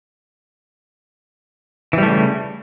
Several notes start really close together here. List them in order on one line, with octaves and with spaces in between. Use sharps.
E3 G3 A3 C#3